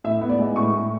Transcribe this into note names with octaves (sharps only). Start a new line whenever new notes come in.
A2 E5
B3
D5
G#3
A2 C#6
A2